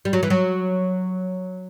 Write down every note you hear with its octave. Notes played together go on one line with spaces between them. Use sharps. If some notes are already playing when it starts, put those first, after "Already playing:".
G3
F#3
E3
F#3